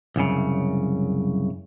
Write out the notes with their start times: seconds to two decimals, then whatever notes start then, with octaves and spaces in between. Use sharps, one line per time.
0.16 C2 F#2 C#3